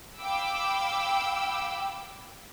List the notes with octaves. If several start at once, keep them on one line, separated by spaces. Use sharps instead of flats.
F5 G5 B5 D6 E6